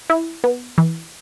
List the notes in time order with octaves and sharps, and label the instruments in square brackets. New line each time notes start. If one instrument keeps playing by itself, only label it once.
[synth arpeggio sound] E4
B3
E3